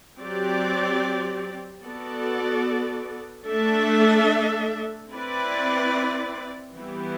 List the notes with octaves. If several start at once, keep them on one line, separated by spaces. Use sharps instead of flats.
F#3 C4 G4 D5
B3 F#4 A4 D5
A3 D4 A4 E5
C4 E4 B4 D5
E3 G3 B3 E4 G4